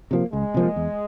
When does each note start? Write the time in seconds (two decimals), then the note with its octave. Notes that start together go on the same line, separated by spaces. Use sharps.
0.11 C3 F3 A#3
0.33 C#2 G#3
0.54 C3 F3 A#3
0.76 E2